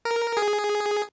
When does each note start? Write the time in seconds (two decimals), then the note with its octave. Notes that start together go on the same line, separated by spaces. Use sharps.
0.05 A#4
0.37 G#4